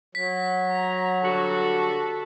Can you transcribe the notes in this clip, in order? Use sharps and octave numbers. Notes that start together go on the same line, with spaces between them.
F#3 B6
A#5
D3 G3 F#4 A4